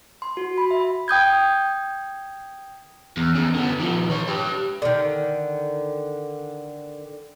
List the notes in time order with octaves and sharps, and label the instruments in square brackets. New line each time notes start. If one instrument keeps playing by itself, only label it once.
[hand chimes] C6
F#4
B5
E5
G5 D#6 G6 G#6
[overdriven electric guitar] E2
E2 C#3
D3 B3
D#3 F3
B4 C#5
G4 B4
[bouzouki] D3 D#3